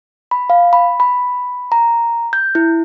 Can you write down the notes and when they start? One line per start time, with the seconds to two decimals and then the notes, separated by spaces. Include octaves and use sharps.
0.31 B5
0.50 F5
0.73 B5
1.00 B5
1.72 A#5
2.33 G6
2.55 E4